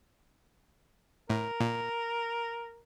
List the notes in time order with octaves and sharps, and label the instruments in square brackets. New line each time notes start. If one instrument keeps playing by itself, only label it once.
[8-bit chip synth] A2 [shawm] A#4
[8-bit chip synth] A#2